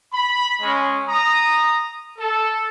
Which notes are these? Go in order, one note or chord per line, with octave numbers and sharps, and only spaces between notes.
B5
G#3 C#4
A#5 D#6
A4